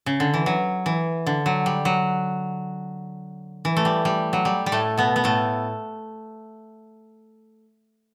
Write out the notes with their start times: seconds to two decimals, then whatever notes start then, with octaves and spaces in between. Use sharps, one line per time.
0.06 C#3
0.20 D3
0.34 E3
0.46 F#3
0.86 E3
1.27 D3
1.46 F#3
1.66 G3
1.85 F#3
3.65 E3
3.77 A3
3.85 G3
4.05 G3
4.33 F#3
4.45 G3
4.66 G3
4.72 A2 A3
4.97 B2 B3
5.16 B3
5.24 A2 A3